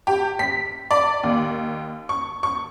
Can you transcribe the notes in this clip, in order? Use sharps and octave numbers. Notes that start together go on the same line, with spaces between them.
G4
B6
D5
D#2
C#6
C#6